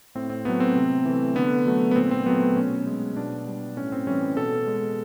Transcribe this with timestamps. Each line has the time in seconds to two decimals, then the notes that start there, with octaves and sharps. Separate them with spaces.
0.15 A2 C4
0.30 C4
0.45 F#3 A3 B3
0.60 C4
0.76 C3
1.05 E3 A3
1.35 D3 B3
1.66 F#3 A3
1.91 B3
1.96 A#2 C4
2.11 C4
2.26 F#3 A3 B3
2.56 B2 C#4
2.86 G#3
3.17 B2 D4
3.47 G3
3.77 A2 C#4
3.92 C4
4.07 E3 G3 C#4
4.37 B2 A4
4.67 G#3